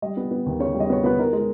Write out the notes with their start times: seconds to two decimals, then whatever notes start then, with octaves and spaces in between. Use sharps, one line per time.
0.02 G3 D#5
0.17 B3
0.31 B3
0.46 D#2
0.60 C#3 C#5
0.74 G3
0.80 D#5
0.90 B3 C#5
1.04 B3 B4
1.18 D#4 A#4
1.33 G#3